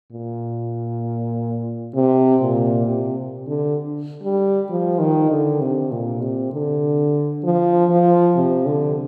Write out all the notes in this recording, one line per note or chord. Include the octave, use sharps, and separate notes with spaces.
A#2
C3
A#2
C3
D3
G3
F3
D#3
D3
C3
A#2
C3
D3
F3
F3
C3
D3